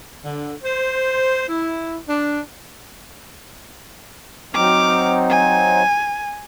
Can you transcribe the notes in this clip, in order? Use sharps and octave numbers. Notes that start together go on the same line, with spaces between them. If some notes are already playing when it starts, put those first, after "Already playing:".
D3
C5
E4
D4
F#3 C4 D#4 D6 F6
G#5